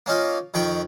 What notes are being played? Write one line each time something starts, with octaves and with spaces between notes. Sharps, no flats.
A#3 C#4 D#4 F4
F2 D#3 F3 G5 C#6